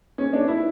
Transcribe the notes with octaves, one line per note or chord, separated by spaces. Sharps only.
C#4
D4
E4